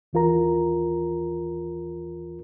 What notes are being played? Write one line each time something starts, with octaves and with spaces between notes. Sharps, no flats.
D#2 E3 F4 A#4 A#5